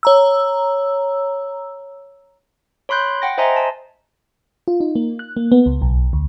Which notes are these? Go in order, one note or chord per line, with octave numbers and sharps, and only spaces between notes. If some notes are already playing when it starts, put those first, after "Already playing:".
C#5 A#5 E6
C#5 B5 C6 F#6 G6
F#5 G5 A#6
C5 D#5 E5 G#5 A#5 C6
A5
F4
D#4
A#3
F#6
A#3
B3
C#2
B1
D2